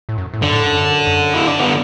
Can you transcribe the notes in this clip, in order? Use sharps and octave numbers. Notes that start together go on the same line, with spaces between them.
A2
F#2
A2
F#2 D3
A2
F#2
F#2
E4
D4
B3